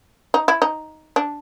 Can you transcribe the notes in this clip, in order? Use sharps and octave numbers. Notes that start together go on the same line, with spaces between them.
D#4
E4
D#4
D4